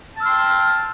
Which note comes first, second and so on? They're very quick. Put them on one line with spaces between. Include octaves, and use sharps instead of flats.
A5 E6 F6 C6 G5